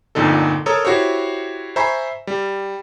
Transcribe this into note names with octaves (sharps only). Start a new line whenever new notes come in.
G1 F2 A#2 D3 D#4 A4
A4 A#4 C#5 A#5 D#6 E6
E4 F#4 G4 C5 C#5
C5 E5 G#5 A#5 B5 C#6
G3